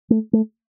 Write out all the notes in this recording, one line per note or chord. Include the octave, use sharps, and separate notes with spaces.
A3
A3